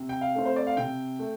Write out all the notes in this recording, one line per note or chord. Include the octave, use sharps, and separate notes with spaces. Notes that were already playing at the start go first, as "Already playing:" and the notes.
Already playing: C3
G5
F5
A3 C4
C5
D5
F5
C3 G5
A3